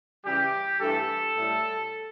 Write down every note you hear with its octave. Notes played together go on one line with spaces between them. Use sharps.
C#3 E3 G3 G4
G2 E3 A3 A4
A2 G3